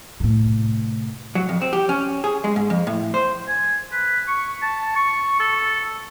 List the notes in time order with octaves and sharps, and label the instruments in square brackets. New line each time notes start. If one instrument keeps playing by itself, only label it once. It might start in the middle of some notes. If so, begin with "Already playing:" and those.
[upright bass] A2 C3
[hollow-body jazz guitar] F#3
F2
C4
G4
C#4
G#4
G#3
G#2
F2
A2
C5
[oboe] G#5
B4
C#6
A5
C#6
A4